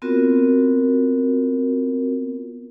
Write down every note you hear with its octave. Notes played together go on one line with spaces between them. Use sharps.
B3 C4 F4 F#4 A#4